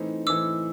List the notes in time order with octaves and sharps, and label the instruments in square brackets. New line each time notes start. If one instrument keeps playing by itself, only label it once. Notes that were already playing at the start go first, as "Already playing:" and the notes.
Already playing: [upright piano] E3 A3 C4 D#4
[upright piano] E3 A3 C4 D#4 [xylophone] D6 E6